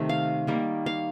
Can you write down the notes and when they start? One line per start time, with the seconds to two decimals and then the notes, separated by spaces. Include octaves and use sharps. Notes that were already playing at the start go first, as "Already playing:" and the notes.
Already playing: C3 D#3 A3
0.09 F5
0.47 D#3 G3 A#3
0.86 F5